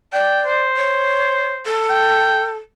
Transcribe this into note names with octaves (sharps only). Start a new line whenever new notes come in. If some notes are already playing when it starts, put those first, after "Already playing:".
D5 G5
C5
C#5
A4
G5